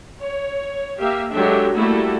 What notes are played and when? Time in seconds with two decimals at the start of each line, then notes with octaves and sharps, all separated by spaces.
0.21 C#5
0.99 A#3 G4 E5 F5
1.32 F#3 G#3 D4 G4 A4 E5
1.74 G3 A3 A#3 E4 F#4 A4